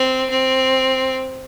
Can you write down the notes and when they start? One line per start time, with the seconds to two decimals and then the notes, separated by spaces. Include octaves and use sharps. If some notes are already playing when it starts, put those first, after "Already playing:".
Already playing: C4
0.30 C4